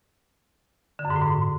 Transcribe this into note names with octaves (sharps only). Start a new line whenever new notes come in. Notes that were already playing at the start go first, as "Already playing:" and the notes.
D3
F#2
G#2
A2
G#2